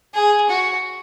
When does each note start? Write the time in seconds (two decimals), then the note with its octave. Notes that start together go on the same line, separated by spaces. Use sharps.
0.14 G#4
0.49 F#4